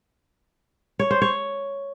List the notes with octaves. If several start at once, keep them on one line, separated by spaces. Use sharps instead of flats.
C#5
C5
C#5